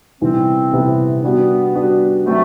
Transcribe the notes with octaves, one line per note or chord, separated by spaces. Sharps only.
C3 E3 G3 B3 C4 E4
C3 E3 G3 B3 E4
G3 B3 D4 F#4 B4
G3 D4 F#4 B4
F#3 A3 C4 F#4